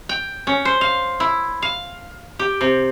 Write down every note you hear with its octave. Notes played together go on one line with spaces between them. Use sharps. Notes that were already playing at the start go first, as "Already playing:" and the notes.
G5
C#4
C5
F5
E4
F5
G4
C3